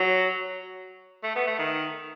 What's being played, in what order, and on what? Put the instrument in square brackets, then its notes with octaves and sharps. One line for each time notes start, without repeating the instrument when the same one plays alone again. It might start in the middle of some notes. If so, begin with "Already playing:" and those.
Already playing: [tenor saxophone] F#3
A3
B3
A3
D#3